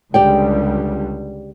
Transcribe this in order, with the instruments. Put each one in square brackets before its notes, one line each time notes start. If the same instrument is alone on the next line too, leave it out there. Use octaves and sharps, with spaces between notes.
[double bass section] C#2 D3 G3 [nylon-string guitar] G4 D5 G5